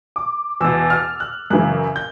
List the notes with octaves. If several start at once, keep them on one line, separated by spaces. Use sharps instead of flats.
D6
E2 B2 E6
F6
F#6
F#2 C#3 E3 F#6
G6